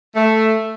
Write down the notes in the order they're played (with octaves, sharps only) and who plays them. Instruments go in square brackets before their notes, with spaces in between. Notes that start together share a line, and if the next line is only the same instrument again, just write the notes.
[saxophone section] A3